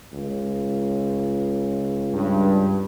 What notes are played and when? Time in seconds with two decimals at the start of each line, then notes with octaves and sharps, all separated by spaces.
0.13 C#2
2.13 G2